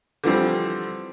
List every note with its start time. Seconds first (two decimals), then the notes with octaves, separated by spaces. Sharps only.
0.24 D3 E3 F3 G3 C4